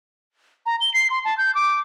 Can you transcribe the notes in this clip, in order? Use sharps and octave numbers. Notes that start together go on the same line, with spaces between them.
A#5
G7
C7
C6
A5
G6
D6